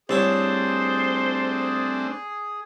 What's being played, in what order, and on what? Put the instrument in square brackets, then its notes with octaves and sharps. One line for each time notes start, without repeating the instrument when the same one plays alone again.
[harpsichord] C2 A4 C#5 [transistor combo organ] A3 C4 D4 [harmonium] G#4 [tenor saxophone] C5